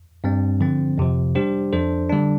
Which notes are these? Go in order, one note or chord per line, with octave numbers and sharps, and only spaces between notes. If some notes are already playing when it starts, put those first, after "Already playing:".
G2 G3 C4
D3 F3 C4
F2 C3 F3
G3 D4 G4 C5
F2 F3 D4 A4 C5
D3 G3 D4